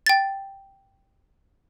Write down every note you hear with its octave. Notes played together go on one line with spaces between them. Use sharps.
G5 A6